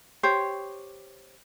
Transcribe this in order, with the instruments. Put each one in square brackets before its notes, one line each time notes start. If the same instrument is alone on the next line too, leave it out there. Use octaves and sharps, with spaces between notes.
[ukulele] G4 C5 C#5